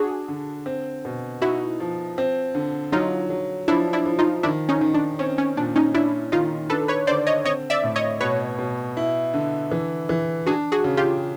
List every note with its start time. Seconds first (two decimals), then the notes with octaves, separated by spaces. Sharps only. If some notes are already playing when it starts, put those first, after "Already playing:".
Already playing: D4 F#4 G#4
0.28 D3
0.66 C4
1.05 B2
1.42 D#4 E4 F#4
1.80 F3
2.18 C4
2.55 D3
2.92 F#3 D#4 F4
3.30 F#3
3.68 F3 D4 E4
3.93 D4 E4
4.06 F3
4.19 D#4 F4
4.43 D#3 D4 E4
4.69 C#4 D#4
4.81 D#3
4.94 D4
5.19 C4 C#4
5.38 C#4
5.57 A#2 D4
5.76 C#4 D#4
5.94 C#4 D4 E4
6.32 D#3 D#4 F4
6.70 D4 A4 B4
6.88 B4 C#5
7.07 D3 C5 D5
7.27 C#5 D#5
7.45 C4 C#5 D#5
7.70 D5 E5
7.83 A2
7.96 C#5 D#5
8.20 B2 B4 C#5
8.58 B2
8.97 E4
9.34 D3
9.71 E3
10.09 E3
10.46 D4 F#4 G#4
10.72 F#4 G#4
10.84 C#3
10.97 F4 G4